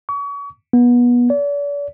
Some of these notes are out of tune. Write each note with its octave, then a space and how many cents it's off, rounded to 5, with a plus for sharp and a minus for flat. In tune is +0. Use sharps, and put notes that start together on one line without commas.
C#6 +35
B3 -25
D5 -40